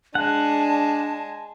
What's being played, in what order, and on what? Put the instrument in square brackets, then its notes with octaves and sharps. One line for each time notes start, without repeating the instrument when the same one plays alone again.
[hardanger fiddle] G#3 [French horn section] D4 [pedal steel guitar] F#5 [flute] A5